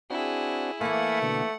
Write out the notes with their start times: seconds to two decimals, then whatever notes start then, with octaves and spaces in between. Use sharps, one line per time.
0.10 C4 D4 E4 F#4 G#4
0.81 E3 A3 A#3 F5 F#5 G#5 B5
1.22 B2 D3